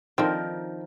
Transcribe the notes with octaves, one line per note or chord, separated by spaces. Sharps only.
D3 D#3 F3 C4 A#4